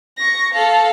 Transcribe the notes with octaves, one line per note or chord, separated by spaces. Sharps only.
C#6 A#6
A4 F5